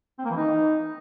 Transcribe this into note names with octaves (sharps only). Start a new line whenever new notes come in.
C4
A#3
E3
D#4